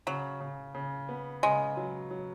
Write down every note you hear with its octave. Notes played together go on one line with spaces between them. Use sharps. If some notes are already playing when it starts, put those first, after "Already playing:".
C#3 F#3
C#3
C#3
B3
C#3 G#3
F#3
F#3